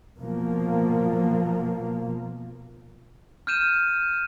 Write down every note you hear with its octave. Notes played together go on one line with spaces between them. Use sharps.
B2 F3 A#3
F6 G6 D#7 E7